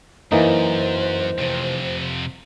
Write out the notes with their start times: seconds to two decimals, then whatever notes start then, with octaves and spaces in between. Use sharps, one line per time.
0.32 F#2 E3 A#3 D#4 C5
1.38 F2 C3